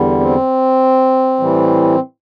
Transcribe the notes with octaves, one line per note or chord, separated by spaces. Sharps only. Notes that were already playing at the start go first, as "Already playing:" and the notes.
Already playing: E2 D3 G3
C4
A2 E3 G3